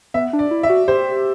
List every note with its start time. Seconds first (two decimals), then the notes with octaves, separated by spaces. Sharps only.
0.14 B3 E5
0.33 D4
0.39 D5
0.51 E4
0.63 E5
0.70 F#4
0.88 G4 C5